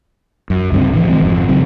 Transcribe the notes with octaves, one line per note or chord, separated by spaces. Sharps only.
F#2
C#2 G2 D3 C4
A2 E3 F3
D#3 G3 G#3 C4
G#1 F2
C#3 F#3 C4